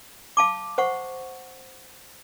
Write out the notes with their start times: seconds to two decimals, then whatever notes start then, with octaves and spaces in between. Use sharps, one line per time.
0.37 F5 A5 D6
0.78 C5 F#5 C#6